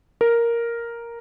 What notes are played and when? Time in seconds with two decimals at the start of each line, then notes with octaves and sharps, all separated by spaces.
0.21 A#4